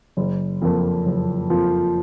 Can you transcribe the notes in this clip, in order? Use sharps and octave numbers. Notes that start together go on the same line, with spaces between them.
F#1
F2 F3 A#3
F#1
F2 F3 A#3